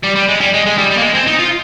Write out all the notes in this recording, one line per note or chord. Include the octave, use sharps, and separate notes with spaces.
G3
G3
G#3
G3
G#3
G#3
G3
G3
A#3
G#3
C4
D#4
F4